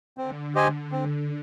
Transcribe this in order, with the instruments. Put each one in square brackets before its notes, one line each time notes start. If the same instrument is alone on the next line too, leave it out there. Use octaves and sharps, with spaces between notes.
[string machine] D3 [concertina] C4
[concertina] G4 C5 D#5 G#5
C4